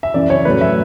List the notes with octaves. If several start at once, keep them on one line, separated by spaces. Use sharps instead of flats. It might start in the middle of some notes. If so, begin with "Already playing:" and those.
E5
F#2 C#3 E3 D5
C#5
A2 F#3 A3 B4
E5